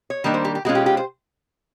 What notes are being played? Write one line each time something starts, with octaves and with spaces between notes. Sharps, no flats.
C#5
D#3 G3 A#3 D4
C5
G4
G4
B2 G#3 C#4 F4 F#4
G4
G4
C5